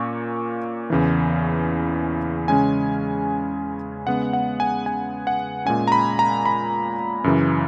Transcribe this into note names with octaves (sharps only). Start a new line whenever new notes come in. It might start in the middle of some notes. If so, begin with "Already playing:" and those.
Already playing: A#2 A#3 C#4 C#6
E2 C#3 E3
C#3 G#3 C#4 G#5
C#3 G#3 B3 F#5
F#5
G#5
G#5
F#5
A#2 G#3 C#4 G#5
A#5
B5
A#5
B5
F#2 C#3 E3